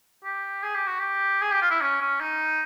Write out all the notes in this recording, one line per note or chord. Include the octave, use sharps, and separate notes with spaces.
G4
G#4
G4
F#4
G4
G#4
G4
F4
E4
C#4
C#4
D#4